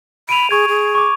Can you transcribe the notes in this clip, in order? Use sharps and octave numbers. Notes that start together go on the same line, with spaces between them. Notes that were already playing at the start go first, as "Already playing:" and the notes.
B5 D7 D#7 F7
G#4 C#6 G#6
G#4
C#6 D6